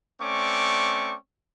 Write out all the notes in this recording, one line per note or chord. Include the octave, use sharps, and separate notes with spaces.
A3 C4 C#4 D5 C#6 D6